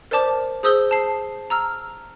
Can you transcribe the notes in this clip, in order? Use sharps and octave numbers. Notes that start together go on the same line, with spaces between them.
A#4 C5 D5 A5 D6
G#4 C5 D#6 E6 G6 G7
A5 C7
A#5 E6 F6